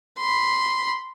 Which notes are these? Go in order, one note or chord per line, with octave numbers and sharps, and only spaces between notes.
B5 C6